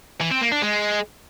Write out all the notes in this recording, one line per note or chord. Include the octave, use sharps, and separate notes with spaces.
E3
C4
A#3
D4
G#3